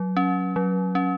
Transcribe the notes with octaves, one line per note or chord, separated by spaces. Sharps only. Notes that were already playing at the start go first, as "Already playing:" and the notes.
Already playing: F#3
C#4
F#3
C#4